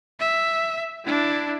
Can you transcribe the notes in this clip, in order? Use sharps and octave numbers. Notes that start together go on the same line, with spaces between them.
E5
D4 E4